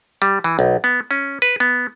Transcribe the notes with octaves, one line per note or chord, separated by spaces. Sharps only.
G3
E3
B1
B3
C#4
B4
B3